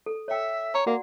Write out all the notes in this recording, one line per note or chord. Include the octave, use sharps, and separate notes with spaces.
A4
C#5 E5 G5
C#5 A#5
A#3 F#4 D5 F#5